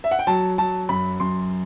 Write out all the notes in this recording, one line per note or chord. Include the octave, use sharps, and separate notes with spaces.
E5
F#5
G5
F#3 A5
F#3 A5
F#2 B5
F#2 C6